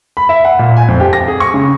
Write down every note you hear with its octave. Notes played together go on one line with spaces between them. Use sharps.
B5
E5
F#5
A#2
G#5
F2
G4
A#6
G#4
C#6
C#3